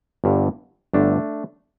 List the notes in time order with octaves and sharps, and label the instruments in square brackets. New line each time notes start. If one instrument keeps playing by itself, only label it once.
[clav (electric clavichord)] G1 G2 D3
G1 G2 D3 A3 D4